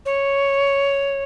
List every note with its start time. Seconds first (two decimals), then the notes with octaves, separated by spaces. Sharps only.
0.06 C#5